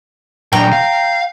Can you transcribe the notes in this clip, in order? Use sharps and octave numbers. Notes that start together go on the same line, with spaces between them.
A#2 F#3 D4 G5 A#5
F5